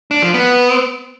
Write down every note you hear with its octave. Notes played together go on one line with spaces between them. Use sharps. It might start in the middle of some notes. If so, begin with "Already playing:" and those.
D4
F3
B3